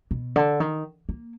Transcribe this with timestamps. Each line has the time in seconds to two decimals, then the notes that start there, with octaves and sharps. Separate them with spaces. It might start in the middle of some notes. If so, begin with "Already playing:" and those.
0.11 B2
0.36 D3
0.60 D#3
1.09 A#3